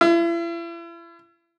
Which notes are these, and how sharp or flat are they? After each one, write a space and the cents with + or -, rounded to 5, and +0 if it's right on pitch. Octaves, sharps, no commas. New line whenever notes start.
E4 +40